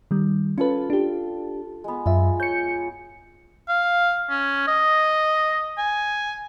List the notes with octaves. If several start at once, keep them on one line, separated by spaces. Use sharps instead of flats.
D#3 G3
C#4 F4 A4 B4
D4 G4
G#3 B3
F#2 F4 E5
C#5 G6 C#7
F5
C#4
D#5
G#5